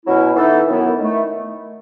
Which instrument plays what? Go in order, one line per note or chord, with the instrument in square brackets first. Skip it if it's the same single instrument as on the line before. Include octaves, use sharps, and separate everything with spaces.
[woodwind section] B2 F#3 C#4 E4
E3 B3 D#4 A4
F#2 D#3 F#3 B3 E4
D#3 A3 E4